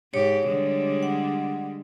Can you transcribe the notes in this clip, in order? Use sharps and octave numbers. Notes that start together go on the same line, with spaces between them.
G#2 G4 C#5
D3 G3 G#3
F#5